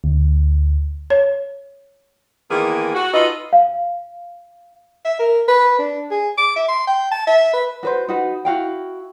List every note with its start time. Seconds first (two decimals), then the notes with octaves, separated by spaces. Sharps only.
0.04 D2
1.10 C#5
2.50 D#3 E3 G#3 A#3 B3 G#4
2.95 F#4
3.14 D#4 F4 A4 B4 D#5
3.53 F5
5.05 E5
5.19 A#4
5.48 B4
5.79 D4
6.11 G#4
6.38 D6
6.56 E5
6.68 C6
6.87 G5
7.11 A5
7.27 E5
7.53 B4
7.83 F#4 B4 C5
8.08 D#4 F#4 B4
8.45 E4 F#4 F5 G5